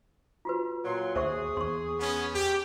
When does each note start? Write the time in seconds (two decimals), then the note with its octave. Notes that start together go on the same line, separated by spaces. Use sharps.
0.45 F4 F#4 B4
0.85 A#2 F#3 C6
1.16 D#2 G#4 C5 E5 C#6
1.57 E2 C6 C#6
1.98 B3 C#4
2.34 G4